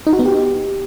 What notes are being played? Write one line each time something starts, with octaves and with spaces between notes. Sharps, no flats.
D#4
F#4
B3
G4